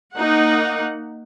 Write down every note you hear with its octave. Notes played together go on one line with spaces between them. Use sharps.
A#3 D#4 F#5